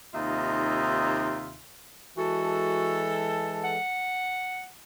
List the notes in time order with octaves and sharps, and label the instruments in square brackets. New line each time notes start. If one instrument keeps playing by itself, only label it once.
[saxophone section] D#2 C3 D#4 F4 E5
[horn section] E3 G#3 A4 [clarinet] F#4
[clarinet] F#5